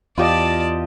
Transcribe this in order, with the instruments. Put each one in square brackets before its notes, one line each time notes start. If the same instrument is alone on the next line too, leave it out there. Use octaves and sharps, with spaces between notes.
[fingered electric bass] E2 [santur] F4 G4 D#5 [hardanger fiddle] D5 A5